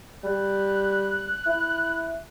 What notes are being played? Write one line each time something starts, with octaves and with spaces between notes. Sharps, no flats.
G3 F#6
E4